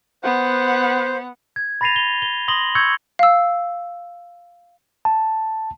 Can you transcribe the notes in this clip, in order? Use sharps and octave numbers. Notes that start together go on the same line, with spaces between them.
B3 C5 F#5
G#6
B5 A6 A#6 C7 D#7 F7
F7 G7
G7
C6 D#6 A#6 F#7 G7
C#6 E6 G6 G#6 C#7
F5 E6
A5